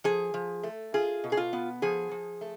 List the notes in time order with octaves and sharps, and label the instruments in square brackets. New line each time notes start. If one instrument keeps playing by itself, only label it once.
[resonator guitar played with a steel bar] F3 G#4
F3
A3
F4 G#4
B2
G#4
F4
B3
F3 G#4
F3
A3